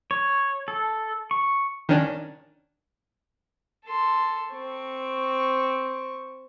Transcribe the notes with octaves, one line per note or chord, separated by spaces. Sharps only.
C#5
A4
C#6
D#3 C#4 D4
A4 C6
C4 C#6